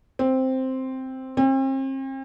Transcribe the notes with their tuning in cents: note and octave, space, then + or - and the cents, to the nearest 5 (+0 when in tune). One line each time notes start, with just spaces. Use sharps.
C4 +0
C4 +40